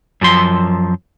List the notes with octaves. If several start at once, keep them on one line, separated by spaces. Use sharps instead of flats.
F#2 F3 C6